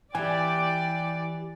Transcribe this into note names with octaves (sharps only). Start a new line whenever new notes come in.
E3 G4 D5 G5 G#5